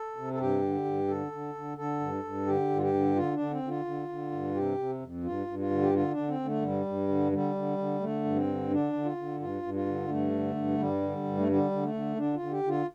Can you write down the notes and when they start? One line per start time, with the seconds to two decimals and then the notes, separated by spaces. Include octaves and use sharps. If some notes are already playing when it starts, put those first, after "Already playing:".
Already playing: A4
0.16 C3
0.33 A4
0.39 G2 G4
0.62 D3
0.85 G2
1.08 D3 A4
1.32 D3
1.55 D3
1.77 D3 A4
2.00 G2
2.24 G2
2.46 D3 G4
2.70 G2
2.77 F4
2.81 G4
2.94 D3
3.16 D3 F4
3.33 D4
3.39 D3
3.51 C4
3.63 D3 F4
3.85 D3
4.08 D3
4.32 G2
4.55 C3 G4
4.78 C3
5.01 F2
5.24 G2 F4
5.47 G2
5.59 F4
5.70 D3
5.82 G4
5.93 D3 F4
6.11 D4
6.16 D3
6.28 C4
6.40 D3
6.45 A3
6.62 G2 G3
6.86 G2
7.08 D3
7.32 D3 G3
7.55 D3
7.78 D3
8.00 D3 A3
8.25 G2
8.36 C4
8.47 D3
8.70 D3 D4
8.93 D3
9.05 F4
9.17 D3
9.40 G2 F4
9.62 G2
9.74 F4
9.86 D3
10.09 G2 A3
10.32 D3
10.55 G2
10.78 G2 G3
11.02 D3
11.24 G2
11.37 A3
11.48 D3 G3
11.71 D3
11.82 A3
11.94 D3
12.16 D3 D4
12.34 F4
12.40 D3
12.51 G4
12.63 D3
12.68 F4